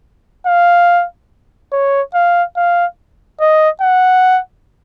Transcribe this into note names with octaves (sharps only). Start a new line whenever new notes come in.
F5
C#5
F5
F5
D#5
F#5